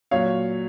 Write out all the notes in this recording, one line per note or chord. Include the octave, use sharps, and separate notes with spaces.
A#2 F#3 C#5 F5